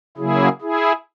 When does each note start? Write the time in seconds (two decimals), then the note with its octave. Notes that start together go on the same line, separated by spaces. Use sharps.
0.17 C#3 F#3 A#3 E4 G#4
0.61 E4 G#4